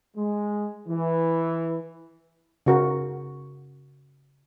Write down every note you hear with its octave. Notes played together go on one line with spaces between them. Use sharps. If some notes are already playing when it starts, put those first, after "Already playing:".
G#3
E3
C#3 F#4 A#4